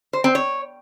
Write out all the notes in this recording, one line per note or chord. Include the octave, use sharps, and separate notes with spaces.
C5
C4
C#5